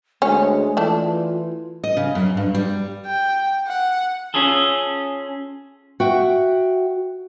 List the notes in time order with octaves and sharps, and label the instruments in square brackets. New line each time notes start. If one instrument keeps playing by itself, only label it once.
[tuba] D2 [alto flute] G#3 [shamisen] C#4
[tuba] E3 [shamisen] A3 D4 [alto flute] F4
[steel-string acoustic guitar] D#5
C#3
F#2
G2
G3
[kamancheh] G5
F#5
[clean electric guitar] C#4 F4 G#4 A4
[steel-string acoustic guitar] F#4 E5 G5